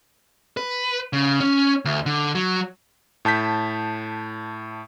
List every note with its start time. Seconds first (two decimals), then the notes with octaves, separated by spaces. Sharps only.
0.57 B4
1.13 C#3
1.40 C#4
1.85 D2
2.06 D3
2.35 F#3
3.25 A2 A5 G6 B6